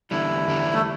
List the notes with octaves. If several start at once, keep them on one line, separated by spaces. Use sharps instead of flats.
E2 D3 G3 E4
E2 D3 G3
A3